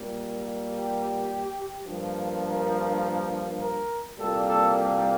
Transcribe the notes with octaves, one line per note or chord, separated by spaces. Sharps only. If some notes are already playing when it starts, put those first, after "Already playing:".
Already playing: A#2 G3 A#3
G4
G2 F3 A#3
A#4
A#4
C2 A#2 G3 A#3 A4
A4
A4